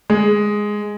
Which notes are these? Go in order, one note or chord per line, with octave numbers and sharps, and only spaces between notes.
G#3